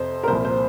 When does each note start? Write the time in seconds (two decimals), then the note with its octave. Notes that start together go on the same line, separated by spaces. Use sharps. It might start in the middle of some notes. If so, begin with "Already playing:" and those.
Already playing: F2 C3 C5
0.23 A#4
0.28 C2 A#2 F3 C5
0.45 C5